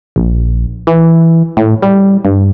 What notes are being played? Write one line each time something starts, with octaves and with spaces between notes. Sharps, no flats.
A#1
E3
A2
G3
G2